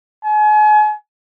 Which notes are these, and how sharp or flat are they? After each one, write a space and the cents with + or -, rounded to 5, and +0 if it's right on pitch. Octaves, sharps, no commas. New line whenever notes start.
G#5 +35